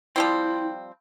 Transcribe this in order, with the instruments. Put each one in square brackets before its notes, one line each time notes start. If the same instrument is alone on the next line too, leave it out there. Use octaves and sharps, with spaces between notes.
[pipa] F3 G3 C4 [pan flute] E4